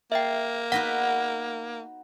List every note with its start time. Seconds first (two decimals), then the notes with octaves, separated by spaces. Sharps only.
0.12 A#3 E5 G5
0.72 B3 D#4 F#4 F#5 A#6